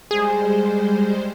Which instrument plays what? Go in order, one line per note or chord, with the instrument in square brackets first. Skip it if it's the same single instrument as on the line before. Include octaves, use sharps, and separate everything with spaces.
[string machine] G3 G#3 C5 [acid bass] G#4